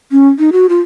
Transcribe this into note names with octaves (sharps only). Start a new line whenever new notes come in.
C#4
D#4
F#4
F4